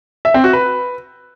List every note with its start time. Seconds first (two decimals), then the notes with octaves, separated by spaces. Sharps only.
0.25 E5
0.34 C4
0.44 F#4
0.53 B4